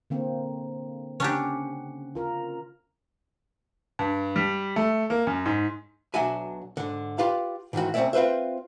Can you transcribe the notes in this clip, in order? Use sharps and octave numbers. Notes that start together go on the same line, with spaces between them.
D3 A#3 C4
C#3 C#4 D4 G4 F#5
F4 A#4
G2
G3
A3
A#3
F#2
G#2
B1 F#3 D4 F#4 E5 G#5
G#2 D3
F4 G4 B4 F5 A5
G#2 D#3 E3 F#4
C2 C4 C#4 C#5 D5 E5
C4 F4 B4 C5 E5